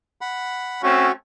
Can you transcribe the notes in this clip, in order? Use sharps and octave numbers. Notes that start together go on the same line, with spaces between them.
F#5 B5
A3 C4 C#4 F#4